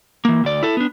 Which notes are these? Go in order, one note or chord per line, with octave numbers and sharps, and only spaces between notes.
E3 A#3
D2 D5
E4 A4
B3 D4